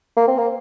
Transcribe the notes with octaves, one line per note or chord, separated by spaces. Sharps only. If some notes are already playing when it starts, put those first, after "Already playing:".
A#3
C4
A#3